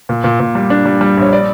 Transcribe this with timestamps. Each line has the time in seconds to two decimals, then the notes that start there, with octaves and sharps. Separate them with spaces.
0.09 A#2
0.24 A#2
0.40 A#2
0.55 G3
0.70 D4
0.85 G3
1.01 G3
1.17 A#1 C#5
1.33 D5